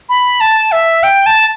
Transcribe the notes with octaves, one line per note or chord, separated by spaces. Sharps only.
B5
A5
E5
G5
A5